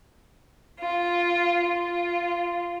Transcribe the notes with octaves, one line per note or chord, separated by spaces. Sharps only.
F4
F4